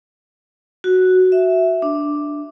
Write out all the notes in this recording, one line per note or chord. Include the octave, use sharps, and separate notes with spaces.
F#4
E5
D4